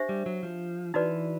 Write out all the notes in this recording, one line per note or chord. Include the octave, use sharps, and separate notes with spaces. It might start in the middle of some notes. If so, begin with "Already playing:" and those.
Already playing: D4 G4 C5 E5
G3
F#3
F3
E3 D#4 F#4 B4 D5